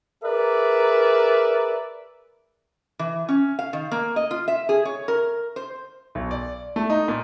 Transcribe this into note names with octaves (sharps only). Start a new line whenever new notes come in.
G#4 A#4 B4 D5 E5
E3
C#4
F5
D#3
A#3
D#5
F4
E5
G#4
C#5
A#4
C5
B1
D5
A3
D#4
A#2